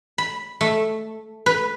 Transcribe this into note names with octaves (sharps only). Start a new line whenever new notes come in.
B5
A3
B4